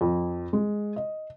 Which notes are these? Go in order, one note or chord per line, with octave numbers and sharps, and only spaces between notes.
F2
G#3
D#5